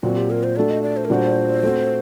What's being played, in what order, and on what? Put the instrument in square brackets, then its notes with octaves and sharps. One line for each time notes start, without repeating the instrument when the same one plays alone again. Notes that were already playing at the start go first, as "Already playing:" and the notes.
[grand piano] A#2 F#3 C4 [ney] F#4
[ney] G4
A#4
C5
[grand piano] A3 D4 F#4 A4 [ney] D5
[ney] D#5
D5
C5
A#4
[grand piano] A#2 G3 D4 F#4 A4 [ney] C5
[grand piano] A3 C4 F#4